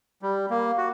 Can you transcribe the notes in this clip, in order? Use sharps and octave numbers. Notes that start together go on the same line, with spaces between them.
G3
A#3
F#4